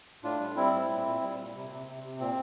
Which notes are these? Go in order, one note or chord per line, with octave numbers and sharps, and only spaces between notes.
A2 D4 F4
G3
G3 C4 E4
A2
A#2
A#2
G3
A#2
C3
C3
C3
C3
A#2 C4